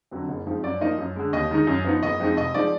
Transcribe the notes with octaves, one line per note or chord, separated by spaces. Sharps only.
F2 D3 F#3
F#1
F2 F3 G#3 D#4
F#2 D5
F3 A#3 D#4 D#5
F#2
D3 G#3
D#2 D#5
D#3 G#3 D#4
F#2
F3 B3 D#4
F#1 D#5
F2 F3 G#3 D#4
F1 D#5
F3 G#3 D#4 D5